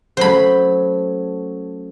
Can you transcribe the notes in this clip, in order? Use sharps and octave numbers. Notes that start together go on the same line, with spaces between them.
F#3 A3 C#4 C5 B5